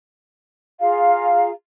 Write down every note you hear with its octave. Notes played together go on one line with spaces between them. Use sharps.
F4 G#4 F5 A#5